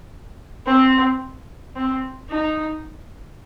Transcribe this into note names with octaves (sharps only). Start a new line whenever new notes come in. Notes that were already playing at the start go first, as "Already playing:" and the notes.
C4
C4
D#4